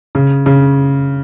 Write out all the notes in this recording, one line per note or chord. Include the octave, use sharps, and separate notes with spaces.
C#3
C#3